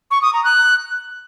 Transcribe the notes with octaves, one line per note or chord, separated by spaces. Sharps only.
C#6
D#6
A#5
F#6